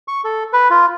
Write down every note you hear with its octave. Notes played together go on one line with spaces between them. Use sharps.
C#6
A4
B4
F4